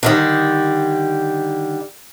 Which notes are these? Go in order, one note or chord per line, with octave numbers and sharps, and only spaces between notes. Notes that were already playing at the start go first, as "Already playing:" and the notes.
D3 D#3 G3